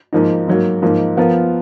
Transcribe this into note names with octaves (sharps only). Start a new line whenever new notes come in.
G#2 F3 A#3 D#4
G#2 F#3 A#3
G#2 F3 A#3 D#4
F3 B3 F4 A#4